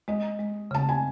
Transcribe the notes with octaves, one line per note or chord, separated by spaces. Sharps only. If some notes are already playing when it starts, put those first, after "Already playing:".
G#3 D#5
G#3
C#3 A5
G#5